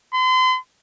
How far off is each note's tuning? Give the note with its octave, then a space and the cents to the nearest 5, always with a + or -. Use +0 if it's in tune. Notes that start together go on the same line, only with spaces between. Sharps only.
C6 -40